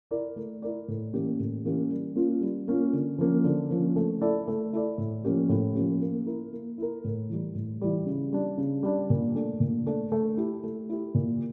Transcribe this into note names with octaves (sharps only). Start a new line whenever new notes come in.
E4 A#4 D5
A3
E4 A#4 D5
A2
E3 A#3 C#4 G4
A2
E3 A#3 C#4 G4
G3
A#3 C#4 F4
G3
A#3 C#4 F4
D3
F3 A#3 C#4
D3
F3 A#3 C#4
A3
E4 A4 D5
A3
E4 A4 D5
A2
F3 A#3 C#4 G4
A2
F3 A#3 C#4 G4
A#3
E4 A#4
A#3
E4 A#4
A2
E3 G3
A2
E3 G3
C#3
G3 D4
C#3
G3 D4
A#2
A3 D4
A#2
A3 D4
A3
E4 G4
A3
E4 G4
A#2